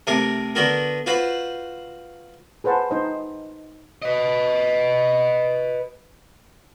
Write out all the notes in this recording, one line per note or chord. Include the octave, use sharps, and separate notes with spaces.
C3 A3 A#4 D6
D3 B3 F#4 A#4
F4 F#4 B4 C5 F#5
G#4 B4 C5 F#5 A5
D#4 C5 D#5
B4 D#5